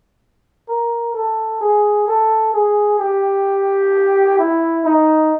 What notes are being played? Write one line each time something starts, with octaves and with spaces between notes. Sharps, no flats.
A#4
A4
G#4
A4
G#4
G4
E4
D#4